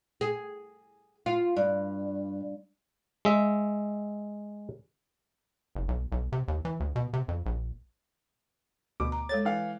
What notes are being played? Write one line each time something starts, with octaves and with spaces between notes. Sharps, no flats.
G#4
F4
G2
G#3 E5
F#1
B1
B1
C3
D#2
E3
D2
B2
C3
F2
A#1
D2 B2 D6
A#5
G#3 A4 C#5 A6
E3 F5